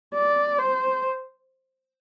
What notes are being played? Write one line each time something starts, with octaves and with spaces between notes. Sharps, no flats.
D5
C5